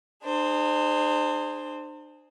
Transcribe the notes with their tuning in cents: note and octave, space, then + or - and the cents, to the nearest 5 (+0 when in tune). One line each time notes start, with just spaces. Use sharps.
D4 +45 G#4 +0 C5 +0